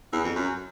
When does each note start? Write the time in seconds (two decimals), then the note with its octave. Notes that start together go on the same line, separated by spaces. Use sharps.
0.13 E2
0.24 F2
0.36 F#2